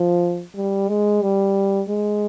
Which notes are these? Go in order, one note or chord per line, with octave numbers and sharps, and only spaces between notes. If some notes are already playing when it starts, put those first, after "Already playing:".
Already playing: F3
G3
G#3
G3
G#3